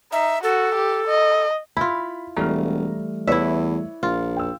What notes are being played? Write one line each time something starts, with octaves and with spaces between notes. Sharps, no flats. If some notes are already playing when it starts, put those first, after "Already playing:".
D#4 E5
F#4 A4
G4
D#5
E4 F4 B5
E1 E3 G3 A3 A#5 F6
E2 E4 B4 C#5 D5 E5
A#1 F4
G5 E6